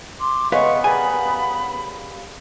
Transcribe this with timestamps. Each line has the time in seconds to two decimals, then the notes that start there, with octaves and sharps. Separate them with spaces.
0.20 C6 D6
0.52 C#3 G#3 A3 B3 B4 C#5 F5 C#6
0.84 C#3 G3 A#3 G#5 B5